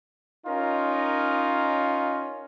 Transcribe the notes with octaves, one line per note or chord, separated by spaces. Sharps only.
C#4 D#4 F4 A#4